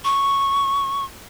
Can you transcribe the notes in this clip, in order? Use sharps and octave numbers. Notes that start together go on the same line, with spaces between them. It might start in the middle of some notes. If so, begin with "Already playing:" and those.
C#6